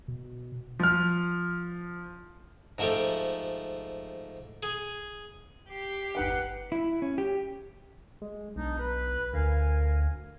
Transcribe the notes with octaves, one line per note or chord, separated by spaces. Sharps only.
B2
F3 F6
G#2 F3 A3 G4
G#4
G4 C7
G1 E2 D#4 B4 F#5 G5
E4
C#4
G4
G#3
B1 D4 D#4
B4
D2 A#4 F5 G#5